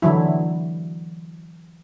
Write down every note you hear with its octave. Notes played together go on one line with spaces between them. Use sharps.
D3 E3 F#3 E4